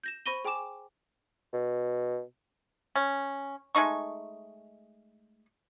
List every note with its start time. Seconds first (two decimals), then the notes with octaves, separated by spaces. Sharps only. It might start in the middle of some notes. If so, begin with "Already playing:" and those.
0.04 G6 A#6 E7
0.26 C5 B5 C#6 A#6 D#7 G7
0.45 G#4 G5 G#5 D6 E7
1.53 B2
2.96 C#4
3.75 G#3 A3 D#4 C#6